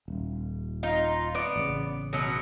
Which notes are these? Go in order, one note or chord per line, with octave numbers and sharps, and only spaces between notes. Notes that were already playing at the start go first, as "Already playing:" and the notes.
D#1
D#4 F4
B3 D5
A1 C#3
B2 F#3